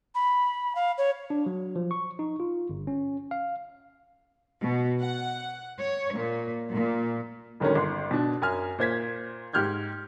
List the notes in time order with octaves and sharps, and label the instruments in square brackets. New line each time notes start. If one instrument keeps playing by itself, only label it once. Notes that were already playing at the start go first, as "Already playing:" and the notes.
[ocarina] B5
F5
C#5
[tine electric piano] D4
F#3
F3
C#6
D#4
F4
G1
C#4
F5
[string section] B2
F#5
C#5
A#2
A#2
[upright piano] E1 D3 D#3 F#3 G#3 C#4
G1 C6
B2 D4
F#2 G#5 F6
A#2 C5 G#6 B6
G#2 G4 F6 G6 G#6